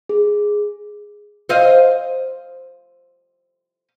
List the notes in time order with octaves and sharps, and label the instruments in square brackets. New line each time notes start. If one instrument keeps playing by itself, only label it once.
[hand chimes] G#4
[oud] C5 D#5 F5